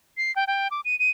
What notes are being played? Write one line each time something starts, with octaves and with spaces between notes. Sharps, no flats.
C7
G5
G5
D6
D#7
D#7